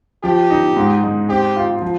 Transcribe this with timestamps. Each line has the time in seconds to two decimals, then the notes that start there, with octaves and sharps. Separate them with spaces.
0.23 F3 G4
0.50 D#4
0.77 G#2
1.03 G#3
1.29 C4 G4
1.56 F4
1.82 F3